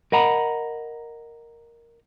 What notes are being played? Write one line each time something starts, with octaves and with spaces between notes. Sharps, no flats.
A#4 D#5 F#5 A#5 B5